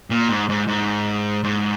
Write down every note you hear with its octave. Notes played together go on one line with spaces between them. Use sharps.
A#2
G#2
G#2
G#2
G#2